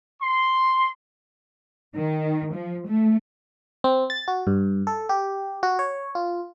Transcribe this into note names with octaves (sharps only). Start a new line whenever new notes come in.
C6
D#3
F3
A3
C4
A6
F#4
G2
A4
G4
F#4
C#5
F4